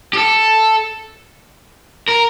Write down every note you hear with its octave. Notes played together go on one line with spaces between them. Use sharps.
G4
A4
A#4